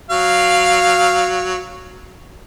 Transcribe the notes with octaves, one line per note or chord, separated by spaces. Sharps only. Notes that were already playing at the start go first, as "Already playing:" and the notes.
F#3 F5